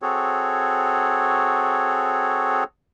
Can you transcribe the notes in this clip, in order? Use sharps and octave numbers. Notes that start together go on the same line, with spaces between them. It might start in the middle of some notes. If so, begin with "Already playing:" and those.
C4 F#4 G#4 A4 C#5